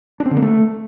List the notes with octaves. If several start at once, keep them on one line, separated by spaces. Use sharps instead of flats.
D4
C4
D3
A#3
A3